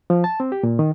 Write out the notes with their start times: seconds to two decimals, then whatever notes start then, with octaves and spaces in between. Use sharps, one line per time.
0.10 F3
0.24 A5
0.40 C4
0.52 G4
0.63 A#2
0.79 D#3